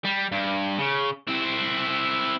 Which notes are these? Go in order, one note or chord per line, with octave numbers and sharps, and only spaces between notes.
G3
G2
C#3
C4 E4